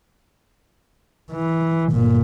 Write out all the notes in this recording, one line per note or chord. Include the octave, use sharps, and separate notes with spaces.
E3
G1 A#2